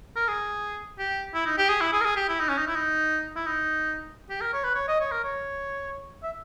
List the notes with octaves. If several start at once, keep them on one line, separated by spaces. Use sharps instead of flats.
A#4
G#4
G4
E4
D#4
G4
G#4
E4
G#4
A#4
G#4
G4
E4
D#4
C#4
D#4
E4
D#4
E4
D#4
G4
A#4
C#5
B4
C#5
D#5
C#5
A#4
C#5
E5